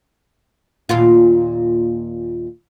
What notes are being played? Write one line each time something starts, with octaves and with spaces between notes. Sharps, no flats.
D#2 A#2 F4